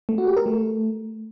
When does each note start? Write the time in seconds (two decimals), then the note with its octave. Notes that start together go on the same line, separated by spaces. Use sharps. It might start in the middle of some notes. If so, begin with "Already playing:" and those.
0.09 A3
0.18 F#4
0.27 G4
0.37 A#4
0.46 A3